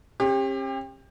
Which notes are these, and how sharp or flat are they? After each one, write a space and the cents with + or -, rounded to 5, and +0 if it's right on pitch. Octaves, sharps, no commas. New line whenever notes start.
C#4 -45 G4 +25